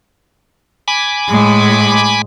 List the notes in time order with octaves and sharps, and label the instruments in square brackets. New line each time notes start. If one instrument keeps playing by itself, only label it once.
[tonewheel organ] G#5 B5 D6
[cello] A2 G#3